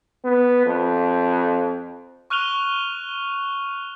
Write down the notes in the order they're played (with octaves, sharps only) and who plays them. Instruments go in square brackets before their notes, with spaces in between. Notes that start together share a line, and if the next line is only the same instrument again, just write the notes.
[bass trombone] B3
F2
[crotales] C#6 F6 F#6 D#7 F7 G7